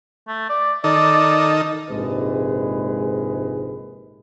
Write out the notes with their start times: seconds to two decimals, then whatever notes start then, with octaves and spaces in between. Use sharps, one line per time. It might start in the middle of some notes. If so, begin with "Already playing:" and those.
0.28 A3
0.49 D5
0.84 D#3 D#4 A4 D5
1.90 A#1 G#2 C3 G#3 B4